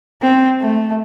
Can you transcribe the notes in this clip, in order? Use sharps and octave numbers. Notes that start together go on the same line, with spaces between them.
C4
A3